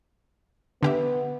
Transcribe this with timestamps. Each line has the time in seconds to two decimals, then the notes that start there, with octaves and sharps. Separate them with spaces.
0.83 D3 B3 G4 E5